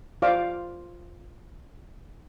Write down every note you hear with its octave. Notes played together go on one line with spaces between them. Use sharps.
F4 C5 D5 F5 D6